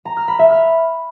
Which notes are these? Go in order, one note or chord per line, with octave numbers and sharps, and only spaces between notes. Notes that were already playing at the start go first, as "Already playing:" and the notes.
A#5
F6
B5
E5
F6